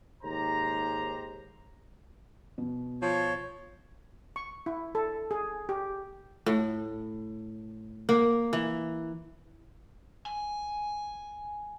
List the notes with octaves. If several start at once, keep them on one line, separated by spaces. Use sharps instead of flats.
D#2 G#2 G4 C5 A#5
B2
F3 C#5
C#6
E4
A4
G#4
G4
A2
A#3
E3
G#5